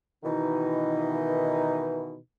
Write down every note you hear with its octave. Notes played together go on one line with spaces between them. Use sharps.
B2 D#3 E3 D#4